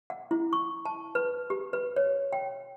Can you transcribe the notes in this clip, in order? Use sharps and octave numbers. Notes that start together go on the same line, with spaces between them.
F#5
E4
C#6
A5
B4
G4
B4
C#5
G5